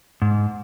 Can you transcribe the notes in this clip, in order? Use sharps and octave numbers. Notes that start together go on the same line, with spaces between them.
G#2